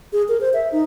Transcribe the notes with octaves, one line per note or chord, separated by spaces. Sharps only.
G#4
A#4
C5
E5
D#4